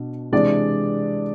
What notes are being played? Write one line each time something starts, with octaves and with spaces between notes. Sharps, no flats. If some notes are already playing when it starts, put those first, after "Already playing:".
Already playing: B2 D4
C3 E3 G#3 D4 D5